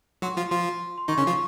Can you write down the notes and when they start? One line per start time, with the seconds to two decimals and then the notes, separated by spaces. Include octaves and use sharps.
0.22 F#3 F#4 C6
0.37 F3 F4
0.51 F3 F4 C6
0.98 C6
1.08 D#3 D#4 C#6
1.18 C#3 C#4
1.27 F3 F4